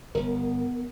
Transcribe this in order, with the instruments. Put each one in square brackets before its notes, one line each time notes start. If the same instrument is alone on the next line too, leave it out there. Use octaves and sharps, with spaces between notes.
[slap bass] G1 [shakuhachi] B3 [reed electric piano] A#4